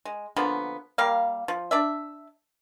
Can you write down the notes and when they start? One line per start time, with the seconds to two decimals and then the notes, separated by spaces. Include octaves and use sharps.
0.05 G#3
0.36 D3 F3 A#3 B3
0.98 G3 A#3 F5
1.48 F3
1.71 D4 D5 E5